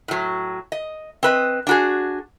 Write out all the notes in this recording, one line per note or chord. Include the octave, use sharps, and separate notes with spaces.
A2 F#3
D#5
C4 B4 D#5
D4 F#4 G#4